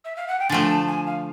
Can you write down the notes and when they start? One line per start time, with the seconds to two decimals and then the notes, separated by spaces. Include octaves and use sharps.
0.04 E5
0.16 F5
0.27 F#5
0.39 G5
0.49 D3 F3 A3 G#5
0.68 A5
0.87 G#5
1.06 F5